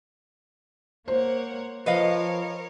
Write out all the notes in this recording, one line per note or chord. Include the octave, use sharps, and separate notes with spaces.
A#3 C5 C#5 F#5
F3 A#4 B4 C#5 D#5 F5